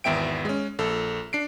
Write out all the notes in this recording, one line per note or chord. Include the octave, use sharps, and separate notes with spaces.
G#1 E2 B3 E5 G5 D7
G#3 C#4
A#1 A4
D4 C7 D7